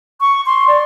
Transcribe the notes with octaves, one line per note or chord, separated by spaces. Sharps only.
C#6
C6
D5